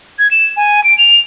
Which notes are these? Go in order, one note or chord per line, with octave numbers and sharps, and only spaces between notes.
G#6
E7
G#5
D7
F7